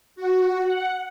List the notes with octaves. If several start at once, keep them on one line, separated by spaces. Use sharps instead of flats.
F#4
F#5